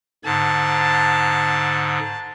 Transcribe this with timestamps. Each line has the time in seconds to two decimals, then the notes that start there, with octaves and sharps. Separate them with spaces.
0.25 G#2 D3 A5